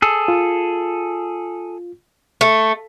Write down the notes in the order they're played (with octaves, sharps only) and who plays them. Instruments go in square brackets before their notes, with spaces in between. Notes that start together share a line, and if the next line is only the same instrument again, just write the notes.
[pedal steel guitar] G#4 A4
[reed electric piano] F4
[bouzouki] A3